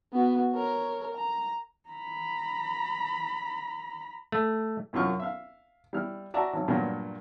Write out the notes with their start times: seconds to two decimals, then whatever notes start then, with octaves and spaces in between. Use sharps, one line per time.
0.13 B3 F#4
0.53 A#4 C#5
1.15 A#5
1.89 A#5 B5
4.32 A3
4.93 C2 F#2 F4 C#6 F6
5.20 E5 F5
5.93 G3 E4 F6
6.34 F#4 D5 E5 A5 A#5 D6
6.53 G#1 F#3
6.68 G2 A#2 F#3 A#3 B3